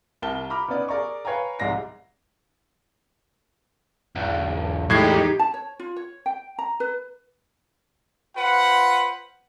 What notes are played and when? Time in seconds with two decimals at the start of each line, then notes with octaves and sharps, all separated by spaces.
0.22 C2 A#4 G5 A5 G7
0.50 A#5 B5 D6 F6
0.68 B3 C#4 D#4 B4 D5
0.88 G#4 A#4 D5 A#5 C#6
1.25 B4 C#5 F5 G5 G#5 A#5
1.59 F1 C2 G#2 D5 A#6 C7
4.16 B1 E2
4.90 E2 A2 G#3 D#4 G4 G#6 C7
5.39 A5
5.54 C#5
5.79 F4
5.96 C#5
6.26 G5
6.59 A#5
6.80 B4
8.37 F4 B4 C5 F#5